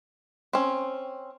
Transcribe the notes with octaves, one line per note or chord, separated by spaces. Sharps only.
C4 C#4